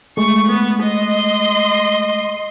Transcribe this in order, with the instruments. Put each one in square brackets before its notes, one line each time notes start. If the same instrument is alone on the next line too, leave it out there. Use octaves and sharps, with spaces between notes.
[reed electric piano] G#3 A3 [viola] C#6
[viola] B3
D#5 C6